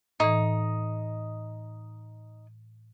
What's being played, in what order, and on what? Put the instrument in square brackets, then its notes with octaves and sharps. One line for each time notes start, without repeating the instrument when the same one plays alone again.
[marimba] A2 E3 [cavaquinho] D#4